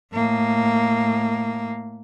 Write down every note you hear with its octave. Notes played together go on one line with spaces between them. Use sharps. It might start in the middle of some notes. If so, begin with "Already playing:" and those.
A2 A#3